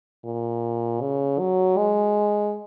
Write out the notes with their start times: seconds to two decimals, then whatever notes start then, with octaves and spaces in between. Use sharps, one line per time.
0.25 A#2
1.01 C#3
1.39 F#3
1.78 G#3